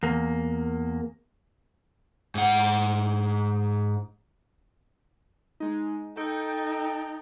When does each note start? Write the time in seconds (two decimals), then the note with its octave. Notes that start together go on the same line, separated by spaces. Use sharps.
0.03 E2 A#3
2.35 G#2 F#5
5.60 G#3 D#4
6.17 D#4 A4 G5